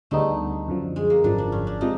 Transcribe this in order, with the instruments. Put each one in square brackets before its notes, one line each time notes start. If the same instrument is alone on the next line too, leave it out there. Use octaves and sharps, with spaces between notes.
[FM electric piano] D2 D3 G3 B3 D#4 [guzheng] A3
[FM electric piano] F#2 D3 F3
[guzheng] G#3
A#3
[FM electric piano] G#1 F#2 D3 F3 [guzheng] D4
[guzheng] D4
C#4
D4
[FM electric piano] C3 F3 G#3 [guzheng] D#4